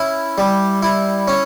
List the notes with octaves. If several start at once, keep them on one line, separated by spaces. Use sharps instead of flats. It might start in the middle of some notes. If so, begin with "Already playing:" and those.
Already playing: C#4 E4
G3
E4
C#4